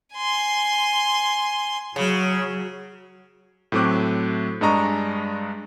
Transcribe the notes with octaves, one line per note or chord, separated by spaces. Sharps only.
G#5 C6
C#3 F#3
A2 F#3 A3 C4 D6 F#6
G2 G#3 D4 D#5 A#5 C#6